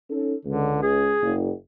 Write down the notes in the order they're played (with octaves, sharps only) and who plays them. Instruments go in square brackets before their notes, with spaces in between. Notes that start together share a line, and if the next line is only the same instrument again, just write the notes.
[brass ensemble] C#4 D#4 A4
[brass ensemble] C#2 [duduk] D3
[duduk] G#4
[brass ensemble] F#1